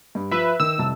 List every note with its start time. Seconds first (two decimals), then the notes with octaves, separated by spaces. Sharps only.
0.15 G2
0.31 F3 B4 E5
0.60 D#3 E6
0.78 F1 C2 A5